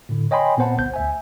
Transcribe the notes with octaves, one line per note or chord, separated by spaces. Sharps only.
A2 D3
C#5 D#5 G5 G#5 B5 C6
A#2 B3 C4 C5 F#5 A5
G1 C2 C5 G6
D2 E5 G#5